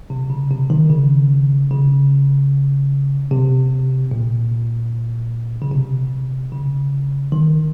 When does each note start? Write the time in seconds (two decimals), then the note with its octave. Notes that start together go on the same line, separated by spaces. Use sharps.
0.10 C3
0.30 C#3
0.50 C3
0.70 D#3
0.90 C#3
1.71 C#3
3.31 C3
4.11 A#2
5.62 C#3
5.72 C3
6.52 C#3
7.32 D#3